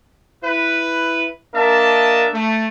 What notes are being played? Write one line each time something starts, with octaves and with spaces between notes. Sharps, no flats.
E4 B4
A#3 D4 A#4 D#5 E5 A5
A3